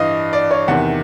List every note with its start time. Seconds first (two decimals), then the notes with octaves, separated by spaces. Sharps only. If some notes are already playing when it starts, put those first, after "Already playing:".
Already playing: G2 E3 D#5 F5
0.33 D5
0.51 C#5
0.68 E2 C3 D#3 F#5